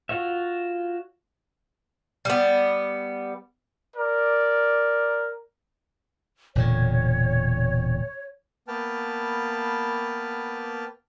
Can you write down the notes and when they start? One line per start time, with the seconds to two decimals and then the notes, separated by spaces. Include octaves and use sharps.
0.09 F4 F#4 C#5 E5
2.25 G3 B3
3.97 A#4 D5
6.55 E1 A#2 D3 C#5
8.68 A#3 B3 B4 G5 A5 F6